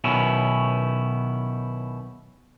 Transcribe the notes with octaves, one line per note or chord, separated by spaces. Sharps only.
B1 B2 D#3 C#4 E4